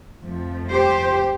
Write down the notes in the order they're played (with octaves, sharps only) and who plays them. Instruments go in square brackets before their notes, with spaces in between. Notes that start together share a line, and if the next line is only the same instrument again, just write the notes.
[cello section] F2 F3 A3
G4 C5